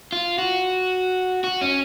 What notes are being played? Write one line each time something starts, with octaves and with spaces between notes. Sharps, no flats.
F4
F#4
F#4
C#4